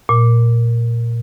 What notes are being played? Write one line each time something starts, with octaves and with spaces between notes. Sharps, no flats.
A#2